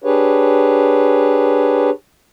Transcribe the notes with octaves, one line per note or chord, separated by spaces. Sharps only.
D4 G4 G#4 B4 C#5